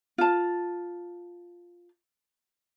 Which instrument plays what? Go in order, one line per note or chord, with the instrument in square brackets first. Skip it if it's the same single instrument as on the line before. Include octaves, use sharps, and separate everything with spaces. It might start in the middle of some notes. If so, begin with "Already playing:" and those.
[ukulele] F4 A5